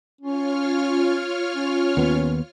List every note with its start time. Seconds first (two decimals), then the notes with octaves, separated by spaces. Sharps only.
0.21 C#4 F4 C#5 F6
1.56 C#4
1.97 D#2 B3